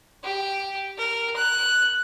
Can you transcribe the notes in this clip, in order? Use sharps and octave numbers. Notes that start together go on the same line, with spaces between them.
G4
A#4
F#6